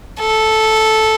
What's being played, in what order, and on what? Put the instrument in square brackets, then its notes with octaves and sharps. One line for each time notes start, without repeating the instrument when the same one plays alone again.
[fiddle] A4